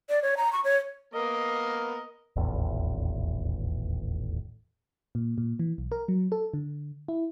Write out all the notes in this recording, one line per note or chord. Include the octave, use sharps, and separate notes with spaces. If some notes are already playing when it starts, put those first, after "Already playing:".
D5
C#5
A#5
C#6
C#5
A#3 B3 A#4 D#5
D#1 A1 E2
A#2
A#2
E3
B1
A#4
F#3
A4
D3
E4